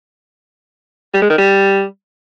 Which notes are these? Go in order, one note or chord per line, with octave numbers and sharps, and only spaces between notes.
G3
G#3
D#3
G3